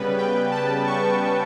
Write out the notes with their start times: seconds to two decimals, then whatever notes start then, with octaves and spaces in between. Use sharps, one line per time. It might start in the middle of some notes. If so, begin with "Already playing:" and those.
Already playing: C#3 G3 B3 B4
0.18 G5
0.51 A5
0.86 C#6